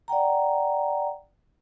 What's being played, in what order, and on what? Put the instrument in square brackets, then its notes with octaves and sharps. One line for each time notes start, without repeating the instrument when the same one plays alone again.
[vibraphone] D5 F#5 G5 A#5